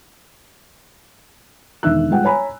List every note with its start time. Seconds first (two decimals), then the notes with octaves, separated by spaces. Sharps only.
1.83 E1 D3 D#3 E5 E6 F#6
2.10 G3 G#3 F4 F#5 G5
2.24 C#5 G#5 A#5 B5